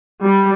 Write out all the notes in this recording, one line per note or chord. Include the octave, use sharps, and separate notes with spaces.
G3